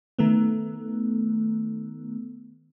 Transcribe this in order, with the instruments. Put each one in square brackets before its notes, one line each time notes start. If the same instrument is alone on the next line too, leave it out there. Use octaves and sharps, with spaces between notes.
[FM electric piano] D#3 A3 B3